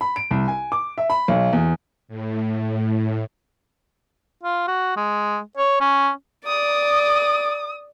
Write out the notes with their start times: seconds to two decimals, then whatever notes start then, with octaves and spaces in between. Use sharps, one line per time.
0.01 B5
0.16 D7
0.31 C2
0.48 G#5
0.72 D6
0.98 E5
1.10 B5
1.28 B1
1.53 E2
2.08 A2
4.43 F4
4.68 F#4
4.97 G#3
5.57 C#5
5.81 C#4
6.47 D5 D#6